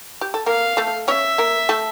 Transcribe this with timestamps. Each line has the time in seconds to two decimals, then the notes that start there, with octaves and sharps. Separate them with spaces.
0.21 G4
0.34 A4
0.46 A#3 A#4 F5
0.77 A3 A4
1.08 C#4 C#5 E5
1.38 A#3 A#4
1.69 A3 A4